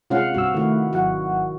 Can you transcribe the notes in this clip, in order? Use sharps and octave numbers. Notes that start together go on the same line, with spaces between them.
C3 G#3 C#4 F4 F5 F#5
C2 G2 F#4 E6
D#3 A3 E4 F#5
G#1 F#3 F#4 F#5